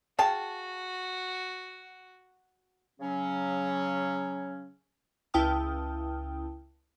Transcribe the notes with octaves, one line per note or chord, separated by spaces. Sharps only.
F#4 G#4 F5 G5 A5
C#3 F#3 C#4
C#2 E4 G5 A5 D#6 F6